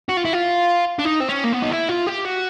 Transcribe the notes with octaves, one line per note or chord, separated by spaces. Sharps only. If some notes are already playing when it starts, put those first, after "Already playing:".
F#4
F4
E4
F4
D4
D#4
C4
C#4
A#3
B3
D#4
E4
F4
G4
F#4